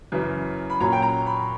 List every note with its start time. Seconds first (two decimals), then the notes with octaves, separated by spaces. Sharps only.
0.12 F#2 C#3 E3
0.70 B5
0.80 A#2 F#3 C#4 A#5
0.92 G5
1.02 A#5
1.26 B5